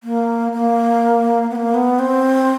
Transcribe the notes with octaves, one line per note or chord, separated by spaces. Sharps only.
A#3
A#3
B3
A#3
B3
C4